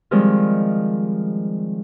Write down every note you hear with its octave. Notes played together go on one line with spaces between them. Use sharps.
D#3 F3 G3 G#3 C4